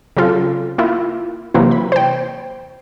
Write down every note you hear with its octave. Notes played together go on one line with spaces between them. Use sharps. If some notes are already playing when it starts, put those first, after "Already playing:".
C#3 F#3 C4 F4 A4
A#3 E4 F4
C3 E3 F#3 A#3 C4 E4
B5
C5 G5